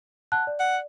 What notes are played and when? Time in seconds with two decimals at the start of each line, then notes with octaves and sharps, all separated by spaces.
0.32 F#5 A5 F#6
0.47 D5
0.60 F#5